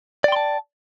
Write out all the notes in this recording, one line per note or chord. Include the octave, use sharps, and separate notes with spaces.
D5 G5 A5 C6